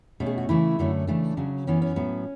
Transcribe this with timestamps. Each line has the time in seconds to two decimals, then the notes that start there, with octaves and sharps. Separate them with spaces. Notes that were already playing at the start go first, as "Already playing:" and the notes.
0.20 B2 A3 C#4
0.26 G#4
0.38 F#4
0.49 C#3 E3 A3 C#4 E4
0.79 F#2 D3 F#3 A3 C#4
1.07 C#3 E3 A3 D4
1.37 C#3 F#3 C#4
1.67 F#2 E3 B3 C#4
1.82 C#4
1.96 A2 F#3 B3